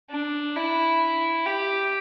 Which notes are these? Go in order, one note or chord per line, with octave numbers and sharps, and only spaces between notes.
D4
E4
G4